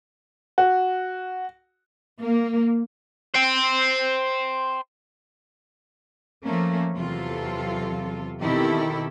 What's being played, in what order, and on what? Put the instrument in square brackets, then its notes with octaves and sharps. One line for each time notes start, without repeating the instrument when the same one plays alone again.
[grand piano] F#4
[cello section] A#3
[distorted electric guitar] C5 G5
[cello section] F3 A3 A#3 C#4
E2 C3 F#3 F4 A4
B2 D#3 C4 E4 G4 A4